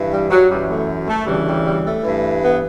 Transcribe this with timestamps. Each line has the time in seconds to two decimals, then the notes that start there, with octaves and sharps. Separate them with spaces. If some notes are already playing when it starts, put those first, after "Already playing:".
Already playing: G2 E3
0.10 G3
0.30 F#3
0.49 F#2 E3 G3
0.68 A3
1.08 A3
1.27 D2 C#3 E3 G3
1.46 G3
1.64 G3
1.84 A3
2.03 G2 E3
2.42 B3